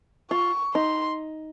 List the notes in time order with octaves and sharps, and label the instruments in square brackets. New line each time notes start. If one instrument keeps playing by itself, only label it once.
[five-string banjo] F4 [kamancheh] C#6
[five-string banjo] D#4 [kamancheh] C6